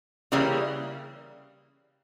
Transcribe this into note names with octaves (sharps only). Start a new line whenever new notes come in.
C#3 E3 G3 A#3